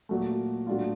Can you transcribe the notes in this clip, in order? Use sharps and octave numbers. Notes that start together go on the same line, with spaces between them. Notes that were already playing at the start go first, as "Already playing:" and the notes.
A#2 F#3 A3
A2 F#3 A3 D4 F4